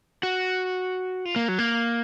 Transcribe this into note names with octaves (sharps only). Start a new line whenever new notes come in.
F#4
F4
A#3
F#3
A#3